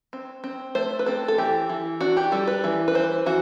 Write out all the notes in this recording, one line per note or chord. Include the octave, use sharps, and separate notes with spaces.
C4
C4
A3 C5
B4
C4 A4
A4
E3 G4
E3
D4 F#4
G4
G3 A4
B4
E3
B4
E3 C5
E3 F#4